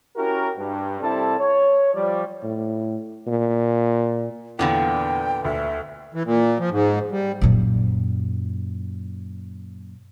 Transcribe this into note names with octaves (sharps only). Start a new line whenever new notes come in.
C#4 E4 F#4 G4 A#4
G2
C2 G3 C4 E4 A4 A5
C#5
F3 G3 D5
A2
A#2
E2 A#2 D3 B3 G5
D2 E5
E3
A#2
F3
G#2
G3
F#2 A#2